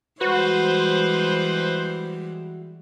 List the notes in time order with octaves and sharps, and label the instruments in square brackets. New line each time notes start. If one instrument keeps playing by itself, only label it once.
[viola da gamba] E3 G3 G#3 [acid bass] F#4 [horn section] B4 C5